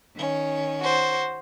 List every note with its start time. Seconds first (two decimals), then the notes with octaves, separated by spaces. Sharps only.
0.16 D#3 C#4
0.81 F#4 C5